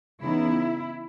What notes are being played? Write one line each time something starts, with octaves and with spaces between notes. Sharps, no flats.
C#3 E3 B3 D#4 E4